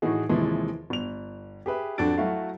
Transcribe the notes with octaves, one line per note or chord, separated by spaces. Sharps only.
A2 E3 D#4 F#4 G#4
D#2 C3 E3 F3 G#3
G1 F7
G4 G#4 B4 E5
F2 D4 F#4 A4 A6 D7
F#3 A3 E4 F#4 F5